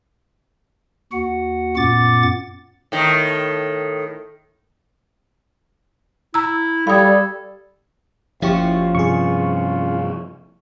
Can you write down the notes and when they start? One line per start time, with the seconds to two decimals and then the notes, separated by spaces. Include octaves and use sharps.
1.12 D#2 F#4 F#5
1.76 F#2 A#2 B3 F#5 D6 A6
2.92 A2 D#3
6.34 E4 A#5 E6
6.87 G3 A4 F5 B5 D#6 G#6
8.42 F#1 F3 C#4 E4 F4 G4 C#6
8.95 G2 C3 G3 G#4 C#6